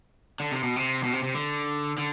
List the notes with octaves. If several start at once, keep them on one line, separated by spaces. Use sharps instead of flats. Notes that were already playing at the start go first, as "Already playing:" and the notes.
D3
C3
B2
C3
B2
C3
C3
D3
D3